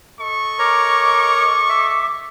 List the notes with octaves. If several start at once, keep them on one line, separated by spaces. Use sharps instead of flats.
A4 D#5 C#6
A#4 C#5 A#5 D6
E5